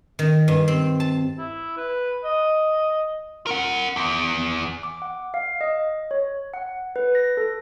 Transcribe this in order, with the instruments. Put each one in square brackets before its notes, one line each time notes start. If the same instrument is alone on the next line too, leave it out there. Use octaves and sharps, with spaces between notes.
[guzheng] D#3
G2
C4
A5
[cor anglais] E4
B4
D#5
[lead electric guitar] A#4 F#5
E2
[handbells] D6
F#5
F5
D#5
C#5
F#5
B4
A#6
A4